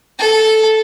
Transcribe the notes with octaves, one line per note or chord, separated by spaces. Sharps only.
A4